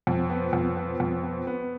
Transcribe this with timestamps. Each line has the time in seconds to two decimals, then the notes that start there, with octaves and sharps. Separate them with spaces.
0.07 F2
0.30 B3
0.53 F2
0.77 B3
1.00 F2
1.23 B3
1.47 B3